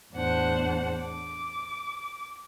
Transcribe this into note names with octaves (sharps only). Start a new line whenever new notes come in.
E2 A2 D4 C5 F#5
D6